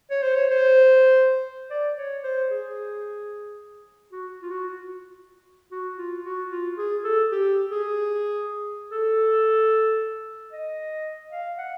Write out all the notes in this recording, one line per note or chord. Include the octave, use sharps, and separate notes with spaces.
C#5
C5
C#5
C5
D5
C#5
C5
G#4
F#4
F4
F#4
F#4
F4
F#4
F4
G#4
A4
G4
G#4
A4
D#5
F5
F#5